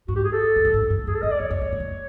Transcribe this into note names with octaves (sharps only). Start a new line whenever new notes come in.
G#2 F#4
G4
G#4
A4
F#2
G2
G#2
G2
F#2 G#4
A4
F2 D#5
D5
E2 C#5
F2
F#2
F#2
F2